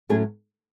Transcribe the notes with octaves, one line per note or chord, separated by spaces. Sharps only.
A2 F#3 A3 C#4 G#4